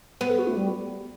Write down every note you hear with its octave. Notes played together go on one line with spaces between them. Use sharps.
B3 B4
A4
F#4
A3
G3